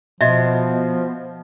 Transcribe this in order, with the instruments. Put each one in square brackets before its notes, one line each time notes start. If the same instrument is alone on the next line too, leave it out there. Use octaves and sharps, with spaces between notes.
[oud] B2 [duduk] F3 [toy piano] F#4 D#5 E5